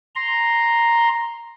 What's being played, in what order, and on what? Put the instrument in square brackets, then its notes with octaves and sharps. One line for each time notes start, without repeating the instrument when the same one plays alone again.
[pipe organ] A#5 C6